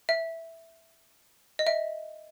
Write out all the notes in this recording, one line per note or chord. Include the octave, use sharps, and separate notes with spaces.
E5
D#5
E5